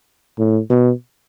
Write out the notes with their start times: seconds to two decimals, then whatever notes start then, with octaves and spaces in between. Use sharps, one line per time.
0.39 A2
0.70 B2